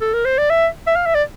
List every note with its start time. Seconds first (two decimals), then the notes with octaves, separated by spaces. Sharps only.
0.01 A4
0.14 A#4
0.25 C5
0.38 D5
0.50 E5
0.87 E5
0.96 F5
1.06 E5
1.15 D5